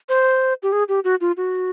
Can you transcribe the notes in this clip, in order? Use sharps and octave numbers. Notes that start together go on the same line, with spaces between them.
C5
G4
G#4
G4
F#4
F4
F#4